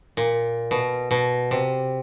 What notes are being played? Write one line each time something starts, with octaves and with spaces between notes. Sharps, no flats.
A#2
B2
B2
C3